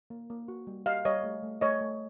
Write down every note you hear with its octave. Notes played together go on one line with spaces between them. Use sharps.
A#3
A#3
F#4
G3
G4 D#5 F5
G3 C#5 D#5
A3
A3
A3 C#5 D#5
A3